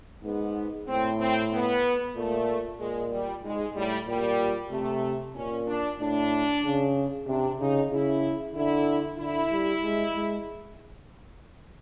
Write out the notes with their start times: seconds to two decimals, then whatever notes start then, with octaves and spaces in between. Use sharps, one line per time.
0.24 G#2 B3
0.88 A2 C4
1.19 C4
1.51 B3
2.16 A#2 A3
2.79 A#2 G#3
3.12 G3
3.43 G#2 G#3
3.75 A2 G3
4.07 A#2 G3
4.71 C3 A3
5.35 A#2 C#4
5.67 D4
5.99 A2 D4
6.63 C#3
7.27 C3 D4
7.59 C#3 D#4
7.91 C#3 E4
8.55 D3 E4
9.19 D3 E4
9.51 G3
9.83 G#3
10.15 G#3